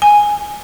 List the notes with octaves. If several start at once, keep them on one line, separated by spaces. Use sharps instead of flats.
G#5